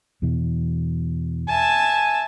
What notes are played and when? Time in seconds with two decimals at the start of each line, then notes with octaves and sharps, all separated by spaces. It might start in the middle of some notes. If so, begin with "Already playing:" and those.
0.22 E2 B2 E3
1.48 E5 G#5 A5